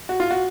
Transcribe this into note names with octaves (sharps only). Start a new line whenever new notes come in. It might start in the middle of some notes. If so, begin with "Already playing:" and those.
F#4
F4
F#4